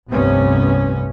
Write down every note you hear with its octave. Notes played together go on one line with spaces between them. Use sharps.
F1 C2 G2 C3 B3 C#4